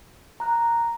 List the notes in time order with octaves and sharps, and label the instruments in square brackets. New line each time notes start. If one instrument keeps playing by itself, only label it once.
[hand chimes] A#5 F#6